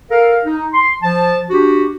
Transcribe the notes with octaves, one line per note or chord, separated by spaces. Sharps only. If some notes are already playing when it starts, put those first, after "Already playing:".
A4 A#4 F5
D#4
C6
F3 A5
D4 F#4 G4